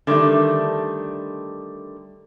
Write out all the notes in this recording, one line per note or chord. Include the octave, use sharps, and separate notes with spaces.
D3 D#3 G3 A3